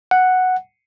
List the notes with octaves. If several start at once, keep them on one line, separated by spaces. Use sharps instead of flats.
F#5